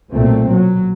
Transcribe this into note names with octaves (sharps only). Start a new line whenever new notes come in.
B1 A#2 A3 C4
F#3